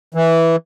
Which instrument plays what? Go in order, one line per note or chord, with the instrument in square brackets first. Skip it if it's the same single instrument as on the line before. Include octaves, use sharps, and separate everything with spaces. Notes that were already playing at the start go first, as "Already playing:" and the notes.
[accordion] E3